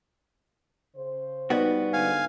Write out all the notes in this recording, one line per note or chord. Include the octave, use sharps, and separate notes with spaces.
C#3 C5
G3 B3 D#4 F#4 B4 D5
G#2 D3 F5 G#5